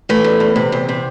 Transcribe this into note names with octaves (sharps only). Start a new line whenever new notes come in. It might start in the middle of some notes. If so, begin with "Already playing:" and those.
E3 A3
E2
E2
C3
E2
C3